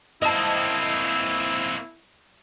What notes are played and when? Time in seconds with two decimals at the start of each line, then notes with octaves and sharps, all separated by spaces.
0.22 A#3 C4 E4 D#5 A5